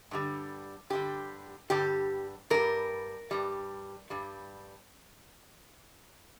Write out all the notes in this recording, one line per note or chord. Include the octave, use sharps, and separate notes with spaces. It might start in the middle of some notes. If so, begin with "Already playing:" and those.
G2 D3 G3
G2 D3 G3 G4
G2 D3 G3 G4
G2 G3 A#4
G2 G3
G2 G3